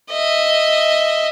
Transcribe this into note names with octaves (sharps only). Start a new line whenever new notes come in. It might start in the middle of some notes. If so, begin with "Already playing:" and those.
D#5 E5